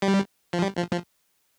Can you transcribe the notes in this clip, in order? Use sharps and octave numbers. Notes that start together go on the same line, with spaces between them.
G3
F3
G3
F3
F3